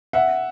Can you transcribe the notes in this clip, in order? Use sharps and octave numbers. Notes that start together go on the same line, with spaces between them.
E5 F#5